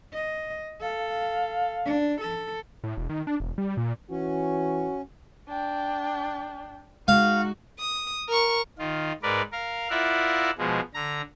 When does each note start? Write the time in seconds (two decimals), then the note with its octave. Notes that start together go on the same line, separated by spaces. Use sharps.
0.13 D#5
0.81 A4 F5
1.85 D4
2.21 A4
2.84 A2
2.97 E1
3.10 D#3
3.27 D4
3.40 E1
3.58 G3
3.77 A#2
4.10 E3 C#4 F#4
5.48 D4 G5
7.08 G#3 D#4 F#4 F5
7.79 D#6
8.28 A#4 C#6
8.78 D#3 F4
9.23 G#2 A#4 B4 D5
9.52 A#4 F5
9.90 E4 F4 A#4 D5 E5 F#5
10.58 B2 F3 G#3
10.94 D3 A#5